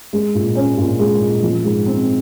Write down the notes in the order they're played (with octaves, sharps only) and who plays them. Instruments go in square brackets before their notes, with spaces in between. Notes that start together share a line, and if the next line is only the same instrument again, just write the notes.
[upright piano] G#3
A#2
C#4
A#2
G#3
A#2
F3
G#2
C4